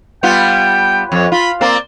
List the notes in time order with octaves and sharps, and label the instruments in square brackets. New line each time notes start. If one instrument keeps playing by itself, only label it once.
[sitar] G3 B3 F4 [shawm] G5
[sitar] F2 [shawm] C#5
[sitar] F4 [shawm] B5
[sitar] A#3 C4 [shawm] D5